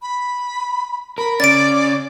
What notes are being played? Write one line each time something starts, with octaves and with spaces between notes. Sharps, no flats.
B5
A#4 B5
C#3 C#4 D5 A6 D7